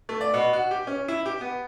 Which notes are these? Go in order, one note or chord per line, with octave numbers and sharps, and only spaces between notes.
A3
D5
B2
F#4
G4
C#4
E4
G4
B3